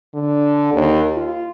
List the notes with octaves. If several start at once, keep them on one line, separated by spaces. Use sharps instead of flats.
D3
D#2
F4